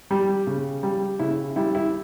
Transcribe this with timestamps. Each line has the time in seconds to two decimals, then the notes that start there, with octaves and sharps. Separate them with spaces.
0.11 G3
0.47 C#3
0.83 G3
1.19 C#3 E4
1.56 G3 E4
1.75 E4